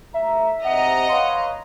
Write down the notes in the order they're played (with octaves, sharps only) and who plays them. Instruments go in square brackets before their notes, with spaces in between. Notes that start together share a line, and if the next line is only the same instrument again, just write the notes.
[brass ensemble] D#2 A2 A#5 [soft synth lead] E5
[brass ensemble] G#2 C3 [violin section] D#5 A#5 [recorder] F#5
[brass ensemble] B4 C#5 F5 [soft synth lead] C6